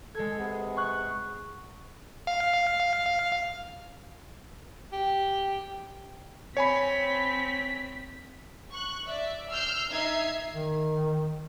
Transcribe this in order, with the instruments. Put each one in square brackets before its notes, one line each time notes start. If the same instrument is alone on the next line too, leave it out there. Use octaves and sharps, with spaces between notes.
[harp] G#3 G#6 [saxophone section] A4
[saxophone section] C3 B3 G#4
[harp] C#6 F#6
[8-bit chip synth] F5
[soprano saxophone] G4
[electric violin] C4 B6 [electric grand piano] C#5 G#5 B5
[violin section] C#6 F#6
D5 E5
E6 F6 G6 C7
D#4 E5 G#6 C7
[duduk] D#3